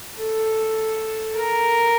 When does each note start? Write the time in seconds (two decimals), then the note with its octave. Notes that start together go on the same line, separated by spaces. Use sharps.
0.18 A4
1.35 A#4